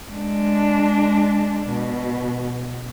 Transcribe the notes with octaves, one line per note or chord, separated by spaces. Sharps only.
G#3 D4
B2